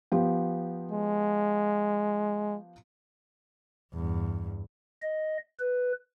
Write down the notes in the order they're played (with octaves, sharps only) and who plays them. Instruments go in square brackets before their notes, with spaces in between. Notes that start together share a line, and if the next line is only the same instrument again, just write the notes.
[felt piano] F3 B3 G4
[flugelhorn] G#3
[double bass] E2 G2
[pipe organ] D#5
B4